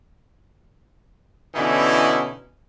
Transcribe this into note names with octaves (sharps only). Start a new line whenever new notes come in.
B2 D3 E3 C#4 D#4 E4